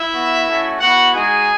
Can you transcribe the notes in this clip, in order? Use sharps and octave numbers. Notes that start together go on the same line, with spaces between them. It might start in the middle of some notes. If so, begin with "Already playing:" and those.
Already playing: E4 E5
B3 F#4
A3 C#4 F#4
B3 E4 F#4 F#5
G#3 D#4 F#4 G#4 G#5